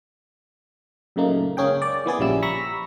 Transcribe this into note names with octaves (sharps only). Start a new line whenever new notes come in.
F#2 A#2 C#3 A3 A#3 D#4
C#2 A#3 C#4 G#4 G5
D5
E3 B3 G#4 D5
A#1 C#3 F3 G3 E4 E6
A#5 B5 C#6 E6 A#6